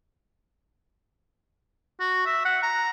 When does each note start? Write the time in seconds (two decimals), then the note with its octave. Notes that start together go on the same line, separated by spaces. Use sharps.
2.00 F#4
2.26 E5
2.45 F#5
2.62 A#5